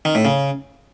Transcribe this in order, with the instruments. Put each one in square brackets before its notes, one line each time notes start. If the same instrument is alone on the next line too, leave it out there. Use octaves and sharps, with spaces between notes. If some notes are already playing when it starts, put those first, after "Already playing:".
[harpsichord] D#3
A2
C#3